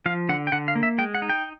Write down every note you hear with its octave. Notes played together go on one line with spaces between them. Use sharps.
F3 F5
D3 F#5
G5
D3 F#5
F5
A#3
E5
G#3 G5
F#5
D#4
G5